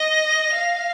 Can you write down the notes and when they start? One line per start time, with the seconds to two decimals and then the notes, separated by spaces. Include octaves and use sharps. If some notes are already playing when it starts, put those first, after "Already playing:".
Already playing: D#5 A#6
0.55 F5